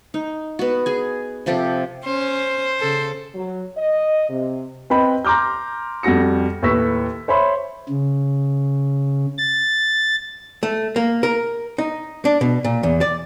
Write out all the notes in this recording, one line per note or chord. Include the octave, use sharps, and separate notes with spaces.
D#4
B3 F#4
G#4 G#5
C3 F3 G4 A4
C#4 C5
C#3 A4
F#3
D#5
C3
C4 B4 D#5 G5 B5
A#5 C6 D6 F6 G6
F2 G3 F#4 A#6 C#7
D#2 A2 B4 C#6 E6 B6
C5 C#5 E5 B5 C6
C#3
A6
A3
A#3
A#4
D#4
D4
B2
A#2
E2
D5